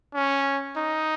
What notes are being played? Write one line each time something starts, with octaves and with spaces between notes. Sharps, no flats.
C#4
D#4